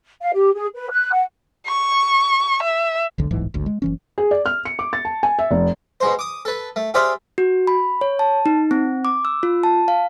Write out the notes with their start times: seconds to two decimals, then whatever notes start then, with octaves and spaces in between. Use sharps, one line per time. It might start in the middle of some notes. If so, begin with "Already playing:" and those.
0.21 F5
0.34 G4
0.54 G#4
0.74 B4
0.90 F#6
1.11 F#5
1.67 C#6
2.63 E5
3.18 E1 B1 D3
3.31 D1 B1 G#2 E3
3.54 G#1 D2
3.66 G#3
3.82 F#1 E3 C#4
4.18 G#4
4.31 D5
4.46 F6
4.65 C#7
4.79 D6
4.93 A6
5.05 A5
5.23 G#5
5.39 E5
5.51 F1
6.00 B2 G#3 C5
6.19 D6 D#6
6.45 A4 B4
6.76 A3
6.94 G4 G#4 C5 D5 E5 F5
7.38 F#4
7.67 B5
8.01 C#5
8.19 A5
8.46 D#4
8.71 C4
9.05 D6
9.25 E6
9.43 F4
9.63 A5
9.88 F5